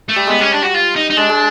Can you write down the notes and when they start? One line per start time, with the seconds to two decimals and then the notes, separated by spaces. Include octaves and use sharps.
0.09 A3
0.16 G3
0.27 G#3 B3
0.39 G3 C#4
0.52 D4
0.62 F#4
0.74 F4
0.95 D#4
1.10 D#4
1.17 G#3 D4
1.29 G#3